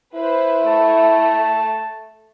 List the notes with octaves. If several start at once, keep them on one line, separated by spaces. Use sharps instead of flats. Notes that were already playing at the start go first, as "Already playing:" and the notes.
E4 B4 C5
A3 A5